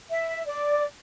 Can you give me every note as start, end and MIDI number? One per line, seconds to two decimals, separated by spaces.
0.10 0.45 76
0.47 0.84 74